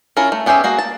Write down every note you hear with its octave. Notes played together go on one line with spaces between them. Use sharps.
C#4 E4 F4 A#4 C#5
A3
B3 C#4 G4 G#4 E5
A#3 F#4 G#4
A5